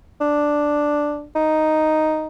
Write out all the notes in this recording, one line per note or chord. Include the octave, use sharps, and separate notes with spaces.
D4
D#4